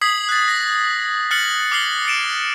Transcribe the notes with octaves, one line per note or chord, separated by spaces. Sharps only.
D#6 G#6 B6 C7 F#7
F#6 A6
A#6
F6 F#6 A6 C7 C#7 F#7
D6 F6 A6 C7 F#7 G7
A6 C#7 D7 E7